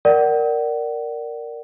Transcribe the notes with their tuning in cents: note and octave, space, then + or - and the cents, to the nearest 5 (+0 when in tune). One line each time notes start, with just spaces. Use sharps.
A#4 +0 D5 +0 F#5 +35